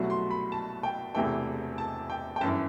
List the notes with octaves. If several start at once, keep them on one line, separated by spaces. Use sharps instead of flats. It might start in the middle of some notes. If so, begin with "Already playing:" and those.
Already playing: C2 B2 F#3 A3
C6
B5
A5
G5
E1 E2 C3 E3 A3 G5
A5
G5
G5
G1 F#2 E3 A5